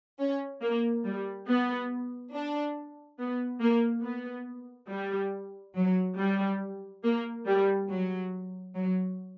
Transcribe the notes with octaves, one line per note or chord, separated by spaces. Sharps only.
C#4
A#3
G3
B3
D4
B3
A#3
B3
G3
F#3
G3
A#3
G3
F#3
F#3